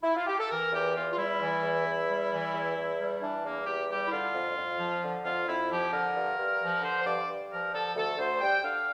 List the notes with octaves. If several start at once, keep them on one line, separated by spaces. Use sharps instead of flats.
E4
F4
G4
A4
E3 A#4
E2 G4
E2 F4
F4
G3 E4
E3
E2
E2
G3
E3
E2
E2
G3
E3 D4
E2 A#3
E2 G4
G3 G4
E4
D3 F4
F2
F2
F3
D3
F2 F4
F2 E4
F3 G4
D3 A#4
G2
G2
F3
D3 C5
C5
G2 D5
G2
F3 A#4
D3 A4
D2 A4
D2 C5
G3 G5
D3 F5